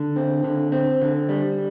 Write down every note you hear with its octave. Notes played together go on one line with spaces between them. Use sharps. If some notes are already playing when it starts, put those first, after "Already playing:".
Already playing: D3
C4
D3
C4
D3
G3